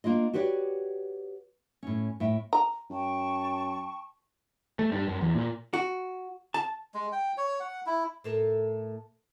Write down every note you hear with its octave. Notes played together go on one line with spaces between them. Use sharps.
A#3 D4 F4 D#5
F#4 G4 B4 C#5 D5
A2 C#4
A2 E5 G5
A#5
F#2 G5 A5 C#6
A3
G2
F#2
E2
A#2
F#4
A5
G#3
G5
C#5
F#5
E4
A2 A4 A#4